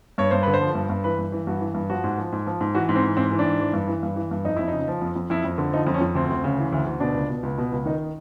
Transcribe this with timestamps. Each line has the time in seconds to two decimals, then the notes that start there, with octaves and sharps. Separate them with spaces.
0.18 G2 C#5
0.31 G2 C5
0.43 D3 B4
0.54 C5
0.61 F3
0.75 G2
0.89 G2
1.04 E3 B4
1.19 G2
1.32 E3
1.47 G2 F#4
1.60 E3
1.74 G2
1.90 F3 F#4
2.04 G#2
2.18 F3
2.32 G#2
2.47 F3
2.61 G#2
2.75 E3 F#4
2.89 G#2
2.95 C4
3.03 E3
3.17 G#2 C4
3.31 E3
3.39 D4
3.45 G#2
3.60 E3
3.73 G2
3.88 E3
4.03 G2
4.16 E3
4.31 G2
4.45 F2 D#4
4.57 F2 E4
4.68 D#4
4.73 C#3
4.88 F3
5.01 F2
5.16 F2
5.30 F2 E4
5.45 F2
5.58 D3
5.72 F3 D#4
5.87 F2
5.94 C#4
6.01 F2
6.15 D2 C4
6.30 D2
6.44 C#3
6.59 E3
6.72 D2
6.86 D2
7.00 B2 D4
7.14 C#2
7.29 B2
7.43 C#2
7.58 B2
7.72 C#2
7.85 D#3 D#4